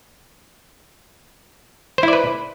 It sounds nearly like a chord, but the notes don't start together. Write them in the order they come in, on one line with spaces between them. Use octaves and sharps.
C5 E4 D5 B4